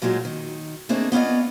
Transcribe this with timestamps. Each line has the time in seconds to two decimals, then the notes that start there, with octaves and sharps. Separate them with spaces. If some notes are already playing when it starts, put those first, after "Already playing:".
0.02 A#2 F#3 G#3 D#4 F4 F#4
0.25 D#3
0.89 A3 A#3 C4 D4 D#4 G#4
1.12 B3 C#4 F4 D5 D#5